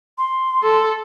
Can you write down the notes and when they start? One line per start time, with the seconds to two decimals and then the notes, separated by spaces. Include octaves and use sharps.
0.18 C6
0.63 A4